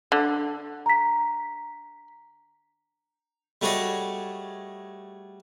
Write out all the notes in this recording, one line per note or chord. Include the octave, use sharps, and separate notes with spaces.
D3
A#5 B6
G3 A3 F#4 G#4 C#5 D#5